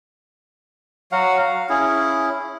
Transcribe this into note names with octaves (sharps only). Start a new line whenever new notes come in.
F#3 F#4 F5 F#5
F5
C#4 E4 G#4